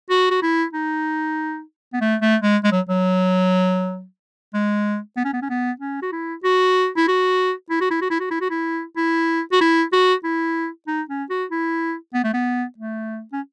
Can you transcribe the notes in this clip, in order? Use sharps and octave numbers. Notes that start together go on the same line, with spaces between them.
F#4
F#4
E4
D#4
B3
A3
A3
G#3
G#3
F#3
F#3
G#3
B3
C#4
B3
C#4
B3
C#4
F#4
E4
F#4
E4
F#4
E4
F#4
E4
F#4
E4
F#4
E4
F#4
E4
E4
F#4
E4
F#4
E4
D#4
C#4
F#4
E4
B3
A3
B3
A3
C#4